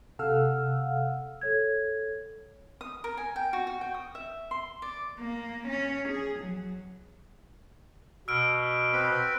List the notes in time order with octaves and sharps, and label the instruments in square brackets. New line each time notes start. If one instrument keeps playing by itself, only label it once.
[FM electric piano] C3 A4 F5 F#5 E6 F6
[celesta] A4 C#5 G#6
[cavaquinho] D#6
A#4
G#5
G5
F#4
F#4
G5
D#6
E5
C6
D5
[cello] A#3
C#4
G#4
F#3
[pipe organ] B2 [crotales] E6 F6 D7
[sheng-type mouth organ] C4 B4